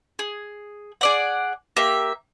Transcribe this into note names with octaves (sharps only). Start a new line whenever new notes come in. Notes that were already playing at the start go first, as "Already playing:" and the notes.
G#4
G#4 D5 F#5
A#3 G4 E5